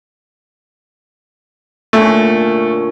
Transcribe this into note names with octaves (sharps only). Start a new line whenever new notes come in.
A#2 D3 A3 C#4